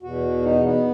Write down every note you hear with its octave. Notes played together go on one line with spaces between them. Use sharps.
E2 B2 F#4
D#4
B3